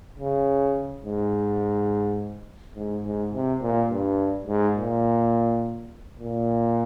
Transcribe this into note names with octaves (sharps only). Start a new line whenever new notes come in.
C#3
G#2
G#2
G#2
C3
A#2
G2
G#2
A#2
A#2